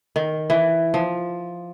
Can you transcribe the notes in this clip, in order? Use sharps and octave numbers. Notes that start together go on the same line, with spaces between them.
D#3
E3
F3